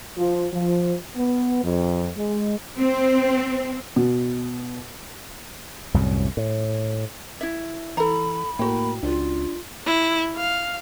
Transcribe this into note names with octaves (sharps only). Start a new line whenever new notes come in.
F3
F3
B3
F2
G#3
C4
B2
C2 F#2 A2
A2
E4 E5
E3 A4 A#5 B5
A2 A#3 F#4 A#4 G5
C#2 D4 F4
E4
F5